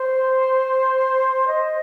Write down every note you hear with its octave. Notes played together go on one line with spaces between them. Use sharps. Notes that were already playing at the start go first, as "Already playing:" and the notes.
Already playing: C5
D#5